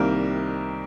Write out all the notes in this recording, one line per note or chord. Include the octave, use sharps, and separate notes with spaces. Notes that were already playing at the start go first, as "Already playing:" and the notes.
Already playing: C2 C3 D#3 G3 A#3 A#4